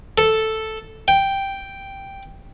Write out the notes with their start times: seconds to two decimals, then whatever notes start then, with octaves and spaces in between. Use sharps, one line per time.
0.18 A4
1.08 G5